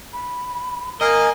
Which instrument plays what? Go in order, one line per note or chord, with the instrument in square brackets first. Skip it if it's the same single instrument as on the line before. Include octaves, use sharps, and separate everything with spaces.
[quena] B5
[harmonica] A#3 A#4 [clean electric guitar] D#5 [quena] G#5